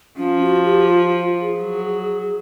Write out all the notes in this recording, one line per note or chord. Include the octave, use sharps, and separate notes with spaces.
F3 C#4
F#4
G4
F4
F4
G#4
F#3